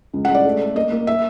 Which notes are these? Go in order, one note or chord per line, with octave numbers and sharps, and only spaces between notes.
C#2
F#5
G#3
D5
A3
A3
A#3 D#5
A#3
E5